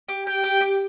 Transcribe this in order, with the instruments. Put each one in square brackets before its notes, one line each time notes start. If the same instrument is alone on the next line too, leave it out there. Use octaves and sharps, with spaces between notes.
[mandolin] G4
[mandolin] G4 [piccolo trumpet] G5
[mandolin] G4
G4